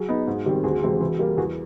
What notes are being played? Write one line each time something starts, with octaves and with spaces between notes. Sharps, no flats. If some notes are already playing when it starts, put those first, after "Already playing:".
Already playing: F#3 F#4 G#4
B3 D#4
G#2
D#3 G3 C4
D2 F#4 G#4
C3 E3 G#3 C4
E3
G3 A#3
E2 F#4 G#4